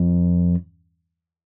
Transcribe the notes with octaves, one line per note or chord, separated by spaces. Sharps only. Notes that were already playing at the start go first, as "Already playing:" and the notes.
Already playing: F2